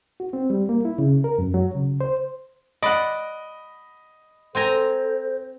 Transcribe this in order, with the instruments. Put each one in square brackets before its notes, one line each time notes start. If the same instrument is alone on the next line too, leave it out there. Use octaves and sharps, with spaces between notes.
[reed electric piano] F#4
C4
G3
A#3
E4
C#3
A#4
F#2
F#3
C#3
C5
[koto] D5 F#5 [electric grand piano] D#5 B5
[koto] C4 G#5 A#5 [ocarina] A4 [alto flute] C5